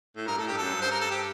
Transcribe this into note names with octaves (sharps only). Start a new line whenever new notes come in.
A2
G2 A#4
A2 A4
G2 G4
F#2 A4
G2
C5
A#4
A4
G4